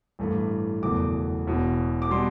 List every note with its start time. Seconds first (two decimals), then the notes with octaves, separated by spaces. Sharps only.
0.19 A1 G2 E3 A3
0.83 F#1 E2 B2 A3 D6
1.47 E1 E2 B2
2.02 D6
2.10 B2 G3 C6